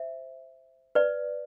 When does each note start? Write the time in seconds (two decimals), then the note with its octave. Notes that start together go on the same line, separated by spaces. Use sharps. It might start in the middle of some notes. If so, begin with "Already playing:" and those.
Already playing: C5 E5
0.95 B4 D5